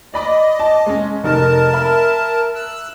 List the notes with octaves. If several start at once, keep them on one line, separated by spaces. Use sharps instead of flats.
D5 D#5 B5 D6
A5 D6
G#3 C#4
F1 D#4 A#4 A5
E5 B5
E6 F#6